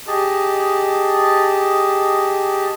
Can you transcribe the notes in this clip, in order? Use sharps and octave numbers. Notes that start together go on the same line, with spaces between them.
G4 G#4 D#5 A5